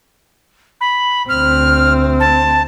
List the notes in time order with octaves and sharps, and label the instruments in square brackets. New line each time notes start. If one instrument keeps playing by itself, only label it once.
[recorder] B5
[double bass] D2 C4 [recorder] F6
[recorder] A5